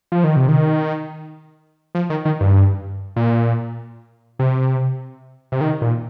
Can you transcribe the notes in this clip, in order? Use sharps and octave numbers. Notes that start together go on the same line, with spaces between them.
F3
D#3
C3
D#3
F3
D#3
D#3
G2
A#2
C3
C3
D#3
A#2